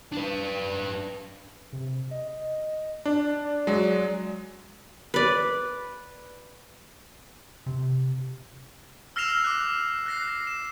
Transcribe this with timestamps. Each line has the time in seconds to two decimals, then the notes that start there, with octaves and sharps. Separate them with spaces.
0.12 D4 B4
1.73 C3
2.11 D#5
3.06 D4 D5
3.67 F#3 G#3
5.14 B4 D5
7.66 C3
9.16 E6 F6 A#6 C7 E7 F7
9.44 D6 F#6
10.06 F#6 A#6 C7
10.47 E7